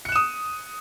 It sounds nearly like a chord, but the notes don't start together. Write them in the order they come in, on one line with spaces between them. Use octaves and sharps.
C#7 F#6 E7 D#6